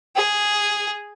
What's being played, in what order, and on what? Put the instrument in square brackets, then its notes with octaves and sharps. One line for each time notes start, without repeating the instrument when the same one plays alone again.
[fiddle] G#4